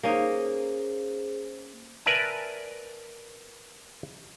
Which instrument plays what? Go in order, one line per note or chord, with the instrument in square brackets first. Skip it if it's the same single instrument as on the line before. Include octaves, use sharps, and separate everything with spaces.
[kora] A#3 C#4 D#4 [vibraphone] G#4 C5
[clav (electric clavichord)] A#4 B4 D5 E5 G#5 A5